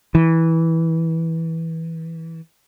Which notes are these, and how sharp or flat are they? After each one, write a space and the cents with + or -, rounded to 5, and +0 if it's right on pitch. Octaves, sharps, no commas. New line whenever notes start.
E3 -15